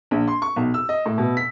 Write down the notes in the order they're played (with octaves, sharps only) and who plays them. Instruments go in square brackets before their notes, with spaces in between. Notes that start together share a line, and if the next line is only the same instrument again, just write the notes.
[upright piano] A#1
C6
C#6
B1
E6
D#5
A2
B2
B6